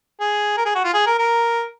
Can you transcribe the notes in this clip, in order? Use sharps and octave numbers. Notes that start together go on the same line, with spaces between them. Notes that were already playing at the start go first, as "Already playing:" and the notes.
G#4
A#4
G#4
F#4
F4
G#4
A#4
A#4